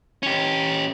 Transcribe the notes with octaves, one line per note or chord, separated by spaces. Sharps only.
C#4 G4